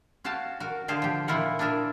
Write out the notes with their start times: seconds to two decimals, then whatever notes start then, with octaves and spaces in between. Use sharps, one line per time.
0.24 C#4 F#4 F5 G5 A5
0.60 F#4 A#4
0.88 D3 G4 G#4 C5 F5
1.02 F3 G4
1.28 A#2 A#3 E4 F4 A#4 F#5
1.59 D4 F4 G#4 A#4 E5